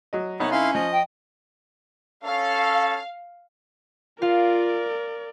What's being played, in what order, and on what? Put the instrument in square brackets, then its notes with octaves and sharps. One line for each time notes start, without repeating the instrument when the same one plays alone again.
[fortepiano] F#3 D#5
[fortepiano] C2 D#4 F#6 [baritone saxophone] B3 [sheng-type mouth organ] C#5
[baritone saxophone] C#4 [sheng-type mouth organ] E4 F5 C6
[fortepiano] F3 [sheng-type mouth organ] D#5
[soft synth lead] G5
[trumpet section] C#4 A4 [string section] F5
[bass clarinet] F4 [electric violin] A#4 D5 [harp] F5